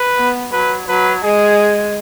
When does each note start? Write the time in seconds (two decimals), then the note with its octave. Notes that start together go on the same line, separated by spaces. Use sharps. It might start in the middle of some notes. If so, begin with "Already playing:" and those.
Already playing: B4
0.17 B3
0.52 F#3 B4
0.88 F#3 B4
1.24 G#3 G#4